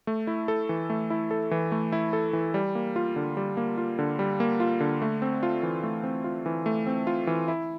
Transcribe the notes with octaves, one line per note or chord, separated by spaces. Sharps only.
A3
E4
A4
E3
A3
E4
A4
E3
A3
E4
A4
E3
G3
A#3
F4
D3
G3
A#3
F4
D3
G3
A#3
F4
D3
A3
C4
F4
E3
A3
C4
F4
E3
A3
C4
F4
E3
E4